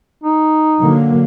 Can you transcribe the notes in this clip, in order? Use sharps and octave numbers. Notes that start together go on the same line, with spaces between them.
D#4
D3 F#3 A#3